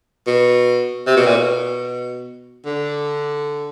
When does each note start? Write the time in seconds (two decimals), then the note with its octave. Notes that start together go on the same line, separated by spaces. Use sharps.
0.27 B2
1.07 C3
1.17 B2
1.26 A#2
1.36 B2
2.66 D3